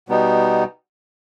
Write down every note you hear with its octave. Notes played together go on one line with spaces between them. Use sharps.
B2 G3 B3 D#4